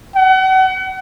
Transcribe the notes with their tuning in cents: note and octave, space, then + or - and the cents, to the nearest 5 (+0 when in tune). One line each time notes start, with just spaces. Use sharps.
F#5 +35